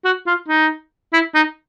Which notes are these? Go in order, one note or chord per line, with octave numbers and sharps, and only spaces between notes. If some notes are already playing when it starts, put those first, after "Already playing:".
F#4
F4
D#4
E4
D#4